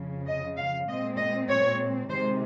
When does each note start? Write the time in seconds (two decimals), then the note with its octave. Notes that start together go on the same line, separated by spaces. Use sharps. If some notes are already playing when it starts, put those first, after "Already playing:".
Already playing: F2 C#3 F3
0.27 D#5
0.58 F5
0.88 A#2 G#3 C4 D#5
1.18 D#5
1.49 C#5
2.09 C3 D#3 G#3 C5